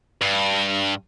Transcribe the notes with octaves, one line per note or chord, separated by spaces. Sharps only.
G2